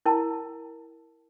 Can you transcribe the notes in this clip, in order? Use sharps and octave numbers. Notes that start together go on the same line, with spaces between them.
E4 A#4 G5 A5